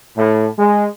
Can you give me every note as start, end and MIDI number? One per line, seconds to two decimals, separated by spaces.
0.17 0.49 45
0.59 0.88 56